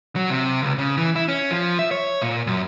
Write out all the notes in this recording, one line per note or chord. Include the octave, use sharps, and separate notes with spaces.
F#3
C3
C#2
C#3
E3
E4
C#4
F3
E5
C#5
A#2
F#2